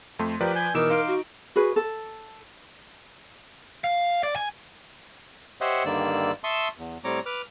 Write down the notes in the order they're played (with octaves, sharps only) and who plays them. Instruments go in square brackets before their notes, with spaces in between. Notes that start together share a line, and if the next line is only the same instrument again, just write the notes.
[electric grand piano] F2 A3 C6
[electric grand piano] F3 B4 D5 [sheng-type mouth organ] G4 A#4
[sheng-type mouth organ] G#5 G6
[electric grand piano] B2 E3 E7 [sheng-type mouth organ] D#4 D6 E6 [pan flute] A#4
[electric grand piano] D#4 D7 [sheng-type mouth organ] F5 C6 D6
[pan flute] F#4
[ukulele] F#4 G#4 B4
A4
[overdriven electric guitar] F5
D5
G#5
[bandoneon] G4 C5 C#5 D#5 E5 F#5
G2 D3 D#3 A#3 D5 E6
E5 A5 C6 C#6 D#6 E6
E2
A2 G3 C4 C#5 A#5 D6
B4 D6 F6